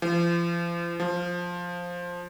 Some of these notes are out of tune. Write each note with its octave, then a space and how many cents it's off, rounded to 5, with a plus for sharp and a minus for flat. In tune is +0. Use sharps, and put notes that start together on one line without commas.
F3 -35
F3 +10